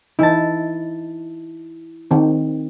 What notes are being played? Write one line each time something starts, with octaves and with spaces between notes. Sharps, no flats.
E3 D#4 E4 A5
D#3 C4